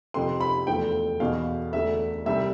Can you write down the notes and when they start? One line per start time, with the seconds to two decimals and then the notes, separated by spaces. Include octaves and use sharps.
0.14 F2 C3 F3 C6
0.40 B5
0.67 E1 D2 D3 F3 B3 G5
1.20 E2 B2 B3 F5
1.73 E1 D2 D3 E5
2.26 C2 C3 G3 E5